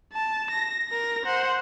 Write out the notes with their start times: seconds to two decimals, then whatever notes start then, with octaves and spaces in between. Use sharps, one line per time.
0.13 A5
0.51 A#6
0.89 A#4 A#6
1.25 C5 F#5